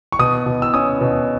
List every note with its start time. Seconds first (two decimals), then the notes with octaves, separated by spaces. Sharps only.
0.12 C#6
0.19 B2 D#6
0.46 B2
0.62 E6
0.74 C#4 D#6
1.01 B2